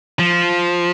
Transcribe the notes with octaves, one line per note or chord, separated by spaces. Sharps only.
F3